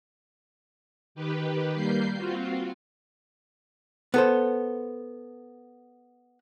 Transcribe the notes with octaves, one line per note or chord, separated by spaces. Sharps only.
D#3 G4 B4
G3 A#3 G6 C7
C4 F4 F#4
B3 A4 C5